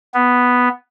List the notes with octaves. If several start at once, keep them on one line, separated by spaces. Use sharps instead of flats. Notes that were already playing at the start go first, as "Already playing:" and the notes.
B3